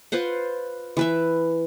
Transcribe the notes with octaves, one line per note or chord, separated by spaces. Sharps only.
F4 B4 C5 F#5
E3 B4 E5